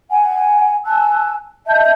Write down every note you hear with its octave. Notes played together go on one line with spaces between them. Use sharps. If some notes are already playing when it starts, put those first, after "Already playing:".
F#5 G#5
G#5 A5 E6 F#6
D#5 E5 A5 G6